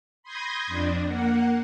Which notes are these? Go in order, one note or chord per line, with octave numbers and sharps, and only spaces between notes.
B5 C6 D#6 G6 G#6 A#6
F2 D4
A#3 F#5